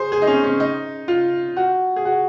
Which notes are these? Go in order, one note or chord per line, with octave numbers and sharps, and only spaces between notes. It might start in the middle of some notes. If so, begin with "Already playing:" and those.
Already playing: G#4 C5
G#4
D#4
C#4
C#4
D#4
F4
F#4
G#4
F#4